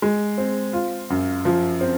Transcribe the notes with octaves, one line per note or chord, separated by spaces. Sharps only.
G#3
C4
F4
F#2
F3
C4